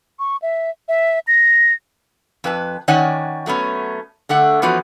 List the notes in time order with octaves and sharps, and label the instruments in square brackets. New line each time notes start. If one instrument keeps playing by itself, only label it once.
[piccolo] C#6
E5
E5
A#6
[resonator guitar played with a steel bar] F2 B4 A5
D#3 C#4 C#5 D5 F#5 G#5
F#3 A3 B3 C#4
D3 A3 F#5
E3 F3 B3 C#4 F#4